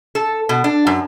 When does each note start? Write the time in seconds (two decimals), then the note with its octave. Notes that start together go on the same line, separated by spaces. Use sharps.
0.15 A4
0.49 B2
0.64 D4
0.87 F#2